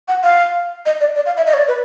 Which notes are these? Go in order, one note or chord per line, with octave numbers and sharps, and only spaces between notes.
F#5
F5
D#5
D5
D5
F5
E5
D#5
C#5
D5
B4